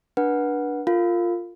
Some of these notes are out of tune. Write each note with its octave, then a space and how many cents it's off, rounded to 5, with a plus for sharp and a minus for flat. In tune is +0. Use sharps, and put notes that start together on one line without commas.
D4 +0 B4 -30 F#5 +0
F4 +0 A#4 -35 F5 +0